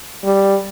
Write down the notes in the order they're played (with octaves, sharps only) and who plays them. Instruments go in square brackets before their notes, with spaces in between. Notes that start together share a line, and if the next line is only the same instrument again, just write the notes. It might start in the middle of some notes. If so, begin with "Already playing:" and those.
[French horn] G3